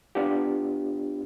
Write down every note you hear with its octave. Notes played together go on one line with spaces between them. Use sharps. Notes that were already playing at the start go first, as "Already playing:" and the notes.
B3 D4 F4 G4